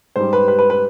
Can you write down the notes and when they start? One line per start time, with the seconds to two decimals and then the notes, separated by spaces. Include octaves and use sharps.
0.16 G#2 G3 C5
0.33 B4
0.48 B4
0.59 B4
0.70 B4